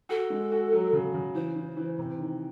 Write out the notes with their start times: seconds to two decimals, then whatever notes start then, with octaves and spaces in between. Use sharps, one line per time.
0.09 F#4 A4
0.30 G#3
0.52 F#4
0.73 F#3
0.93 C#3
1.14 C#3
1.35 E3 C5
1.56 E3
1.77 E3
1.98 C3
2.19 D#3